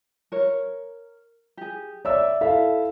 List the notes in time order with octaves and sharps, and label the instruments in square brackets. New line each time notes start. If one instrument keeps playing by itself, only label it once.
[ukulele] A#4 C#5
G4 G#4
[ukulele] C#5 [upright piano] D5 E5 E6
[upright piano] E4 A4 F5 [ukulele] E5